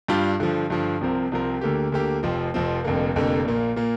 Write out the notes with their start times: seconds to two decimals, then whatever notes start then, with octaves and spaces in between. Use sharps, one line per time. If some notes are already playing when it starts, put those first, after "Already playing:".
0.08 G2 G3 D4 F4
0.40 G2 D3 F3
0.70 G2 D3 F3
1.01 C2 C3 F3 C4 A#4
1.32 C2 C3 F3 C4 A#4
1.61 D2 D3 A#3 G4
1.92 D2 D3 A#3 G4
2.23 F1 F2 F3 C4
2.54 F1 F2 F3 C4
2.84 F1 F2 D3 A#3
3.15 F1 F2 D3 A#3
3.45 A#1 A#2 A#3
3.76 A#2 A#3